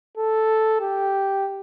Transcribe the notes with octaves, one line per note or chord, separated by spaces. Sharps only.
A4
G4